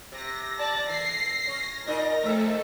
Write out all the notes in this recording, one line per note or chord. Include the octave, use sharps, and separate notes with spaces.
C3 A#6
D5 A5
E3 C7
C#4
A#2 D#4 A#4 D#5
F2 A3 A4 E5